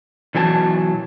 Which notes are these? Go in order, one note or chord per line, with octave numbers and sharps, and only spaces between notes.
B2 E3 F#3 G#5 A5